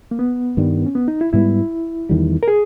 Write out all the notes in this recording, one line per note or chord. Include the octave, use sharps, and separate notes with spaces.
A#3
B3
G2 D#3 G3
C#4
B3
D#4
E4
G#2 G3 B3 E4
E2 D#3 G3
A#4
G#4